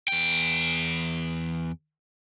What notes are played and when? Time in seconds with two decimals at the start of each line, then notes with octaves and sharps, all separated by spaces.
0.08 E2 G5